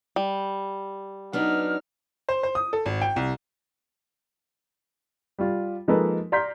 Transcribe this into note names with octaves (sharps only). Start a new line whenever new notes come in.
G3
F#3 B3 D4 D#4 F6
C5
C5
D#6
A4
G#1
G5
C2
G3 F4
F3 G#3 A#3 D#4 A4 B4
D5 A#5 C6 F6 G6 B6